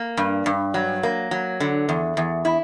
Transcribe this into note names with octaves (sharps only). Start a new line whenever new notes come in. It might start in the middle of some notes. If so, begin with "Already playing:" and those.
Already playing: A#3
G2
G2
F#3
A#3
F#3
D3
E2
E2
E4